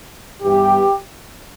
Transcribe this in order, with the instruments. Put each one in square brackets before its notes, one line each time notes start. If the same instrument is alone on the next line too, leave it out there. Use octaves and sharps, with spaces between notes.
[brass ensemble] G2 E3 B3 G4